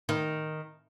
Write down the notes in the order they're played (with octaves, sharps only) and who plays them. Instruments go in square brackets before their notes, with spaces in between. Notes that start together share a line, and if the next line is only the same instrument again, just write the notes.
[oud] D#3